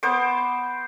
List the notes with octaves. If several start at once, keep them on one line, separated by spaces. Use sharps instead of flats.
B3 C5 D6